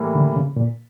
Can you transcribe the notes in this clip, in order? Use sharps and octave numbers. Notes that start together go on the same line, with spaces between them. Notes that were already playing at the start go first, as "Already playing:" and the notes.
Already playing: A2 E3 G3 A#3 E4
D3
C#3
A#2